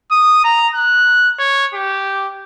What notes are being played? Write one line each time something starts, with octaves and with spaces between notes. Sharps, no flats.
D#6
A#5
F#6
C#5
G4